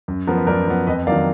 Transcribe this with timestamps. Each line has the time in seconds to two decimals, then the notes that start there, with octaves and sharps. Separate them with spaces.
0.08 F#2
0.27 F3 B3 A#4
0.37 B4
0.47 F#2 A#4 D5
0.68 F3 B3
0.87 F2 B4 D#5
1.07 D#3 F#3 A#3 D5 F5